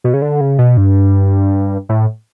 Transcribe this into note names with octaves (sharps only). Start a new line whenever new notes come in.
B2
C#3
D3
C#3
B2
G2
A2